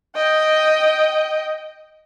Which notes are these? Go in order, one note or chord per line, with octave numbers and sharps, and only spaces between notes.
D#5 G5